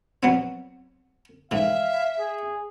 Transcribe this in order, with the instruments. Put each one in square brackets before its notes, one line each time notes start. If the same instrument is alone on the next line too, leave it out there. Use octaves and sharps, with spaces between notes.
[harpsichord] F#3 B3 C4
[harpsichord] G#2 E3 [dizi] E5 [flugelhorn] F5
[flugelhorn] G#4